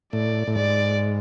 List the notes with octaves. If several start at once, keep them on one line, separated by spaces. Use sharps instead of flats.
A2 D5
A2
G#2 D5